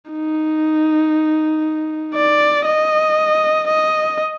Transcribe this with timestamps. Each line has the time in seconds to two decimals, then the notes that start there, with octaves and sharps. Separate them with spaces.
0.11 D#4
2.14 D5
2.66 D#5
3.67 D#5